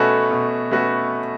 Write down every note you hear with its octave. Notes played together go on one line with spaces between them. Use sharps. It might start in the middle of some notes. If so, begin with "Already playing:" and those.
Already playing: B2 A3 C#4 F#4 A4 B4
B2
A3 C#4 F#4 B4